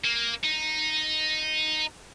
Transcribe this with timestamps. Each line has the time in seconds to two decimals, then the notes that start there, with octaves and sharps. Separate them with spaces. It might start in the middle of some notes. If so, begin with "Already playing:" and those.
0.04 A#3
0.44 D#4